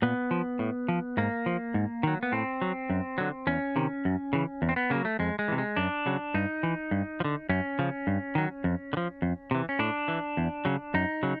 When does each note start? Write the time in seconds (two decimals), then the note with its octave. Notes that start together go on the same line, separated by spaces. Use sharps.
0.02 A#2 B3
0.31 F3
0.59 A2
0.88 F3
1.17 G#2 A#3
1.46 F3
1.74 G#2
2.03 D#3 F#3
2.23 B3
2.32 A2 C4
2.62 F#3
2.90 F#2
3.18 D3 F#3
3.47 E2 C#4
3.76 C3 D#3
4.05 F#2
4.33 C#3 E3
4.62 E2
4.69 C4
4.76 B3
4.90 C#3 F#3 A#3
5.05 A3
5.19 F2 G#3
5.39 G#3
5.48 C3 E3
5.58 G#3
5.76 F#2 D4
6.06 C#3 F#3
6.34 G2 D#4
6.63 E3
6.91 G2
7.20 F3
7.24 D3
7.49 F#2 C#4
7.79 C#3 F3
8.07 G2
8.35 D#3 F#3
8.64 F2
8.93 D3
8.97 F3
9.22 F2
9.51 C3 E3
9.69 C#4
9.79 A2 D4
10.08 E3
10.37 E2
10.65 C#3 F#3
10.94 F#2 D#4
11.23 C#3 F#3